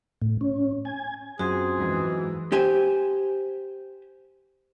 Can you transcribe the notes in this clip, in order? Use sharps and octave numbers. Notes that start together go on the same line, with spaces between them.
A2
C#4
G#5
F#2 C4 F4 F#4 G#4
G#2 E3
G4 C5 G#5